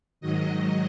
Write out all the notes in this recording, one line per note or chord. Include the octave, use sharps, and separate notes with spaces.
G#2 D#3 F#3 D#5